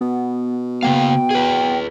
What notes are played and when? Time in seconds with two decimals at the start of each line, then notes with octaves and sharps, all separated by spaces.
0.01 B2 B3
0.83 C#3 A#3 B3 F5 G5
1.30 G#4 B4